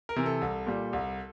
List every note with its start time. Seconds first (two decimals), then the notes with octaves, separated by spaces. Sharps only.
0.09 A#4
0.16 C3 E3
0.26 A4
0.41 C2
0.67 A#2 G3
0.93 C2